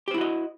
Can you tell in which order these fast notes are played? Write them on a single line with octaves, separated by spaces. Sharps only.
G4 C5 E4 F#4 D#5